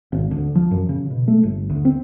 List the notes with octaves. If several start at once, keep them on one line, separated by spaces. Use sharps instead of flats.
G#1
D2
F3
F#2
C#3
B2
A3
G1
D2
C4